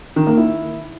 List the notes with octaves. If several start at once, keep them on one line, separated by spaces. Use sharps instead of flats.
D#3
A#3
E4